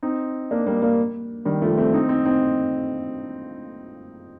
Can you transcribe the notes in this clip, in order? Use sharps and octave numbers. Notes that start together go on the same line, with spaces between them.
C4 D#4
A#3 D4
G3 A#3
G3 A#3
D#3 G3
F3 A3
A3 C4
C4 D#4
C4 D#4
C4 D#4